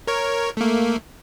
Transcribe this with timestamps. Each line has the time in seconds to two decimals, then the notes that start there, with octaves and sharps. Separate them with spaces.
0.07 A#4 C#5
0.57 A3 A#3